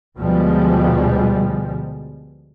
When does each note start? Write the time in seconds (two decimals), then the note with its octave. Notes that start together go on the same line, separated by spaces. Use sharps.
0.17 D2 B2 F3 G3 G#3